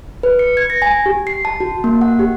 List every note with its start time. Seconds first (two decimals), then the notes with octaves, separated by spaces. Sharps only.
0.23 B4
0.39 C#7
0.57 G#6
0.70 A#6
0.82 G#5
1.06 G4
1.27 C7
1.45 A5
1.60 F#4
1.84 A#3
2.01 F#5
2.19 G4